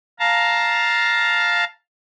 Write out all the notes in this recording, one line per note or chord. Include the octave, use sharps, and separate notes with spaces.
F5 A5 A#5